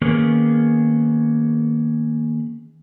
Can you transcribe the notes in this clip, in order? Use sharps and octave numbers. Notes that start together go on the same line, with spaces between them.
D#3 A#3 B3 C#4 G#4 A#4